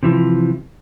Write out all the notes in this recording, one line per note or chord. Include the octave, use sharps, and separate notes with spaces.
C3 E3 F3